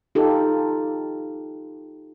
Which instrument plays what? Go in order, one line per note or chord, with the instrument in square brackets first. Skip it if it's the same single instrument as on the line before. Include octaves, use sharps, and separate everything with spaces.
[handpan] D#4 F4 G4 A4